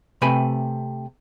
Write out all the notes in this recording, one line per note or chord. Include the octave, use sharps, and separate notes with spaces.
C3 A3 B4 G5 G#5 B5